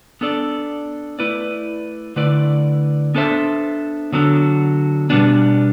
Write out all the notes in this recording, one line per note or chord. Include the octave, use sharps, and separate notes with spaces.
B3 D4 A4 D5
A3 E4 B4 D5
D3 A3 E4 B4 D5
B3 D4 A4 C5 E5
D3 F#3 B3 D4 A4
B2 G3 B3 D4